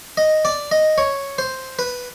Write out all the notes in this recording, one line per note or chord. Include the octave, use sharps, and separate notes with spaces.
D#5
D5
D#5
C#5
C5
B4